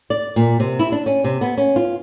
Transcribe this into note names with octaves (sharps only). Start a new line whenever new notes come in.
D5
A#2
C3
E4
D4
C#4
C3
B3
C#4
F4